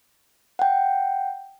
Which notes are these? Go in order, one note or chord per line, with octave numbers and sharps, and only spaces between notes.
F#5 G5